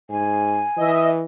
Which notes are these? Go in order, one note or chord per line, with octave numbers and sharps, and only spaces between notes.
G#2 G#5
E3 D#5 E5